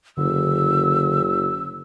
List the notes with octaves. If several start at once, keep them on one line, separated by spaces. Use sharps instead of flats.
F#1 D3 E6